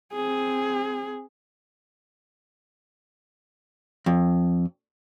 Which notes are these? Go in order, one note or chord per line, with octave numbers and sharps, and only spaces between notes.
C4 G#4
F2